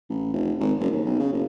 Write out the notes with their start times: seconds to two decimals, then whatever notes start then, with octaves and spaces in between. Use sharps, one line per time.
0.10 A1
0.33 F1
0.60 G#1
0.80 F#1
0.92 D#2
1.05 B1
1.20 C#3
1.33 F#1